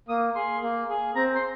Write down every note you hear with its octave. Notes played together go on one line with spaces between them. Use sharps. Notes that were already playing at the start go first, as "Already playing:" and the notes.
A#3 D#6
G#4 C6
A#3
G#4
C4 A#5
C6